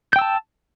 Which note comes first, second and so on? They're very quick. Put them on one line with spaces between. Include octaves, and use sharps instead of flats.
G6 G5 E6 A5